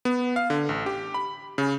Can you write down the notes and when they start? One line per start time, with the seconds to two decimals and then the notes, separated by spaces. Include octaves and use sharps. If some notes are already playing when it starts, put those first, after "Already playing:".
0.05 B3
0.36 F5
0.50 D3
0.69 A1
0.86 G4
1.14 B5
1.58 C#3